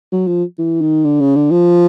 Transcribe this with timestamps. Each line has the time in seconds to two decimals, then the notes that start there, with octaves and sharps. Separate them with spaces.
0.12 F#3
0.27 F3
0.59 E3
0.81 D#3
1.05 D3
1.20 C#3
1.35 D3
1.51 F3